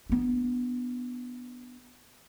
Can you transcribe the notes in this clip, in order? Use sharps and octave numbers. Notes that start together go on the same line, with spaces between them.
B3 D4